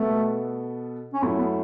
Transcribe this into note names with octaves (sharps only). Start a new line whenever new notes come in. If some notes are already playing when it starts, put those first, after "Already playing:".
Already playing: B2 A3 B3 A4
C#4
F#2 F#3 A3 B3 E4
B3